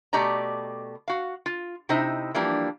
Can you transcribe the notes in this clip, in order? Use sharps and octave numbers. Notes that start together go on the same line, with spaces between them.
B2 A3 G4 D5 D#5 A#5
F#4 F5
F4
C3 D#4 E4 C5 D#5
E3 F3 G3 A#3 D4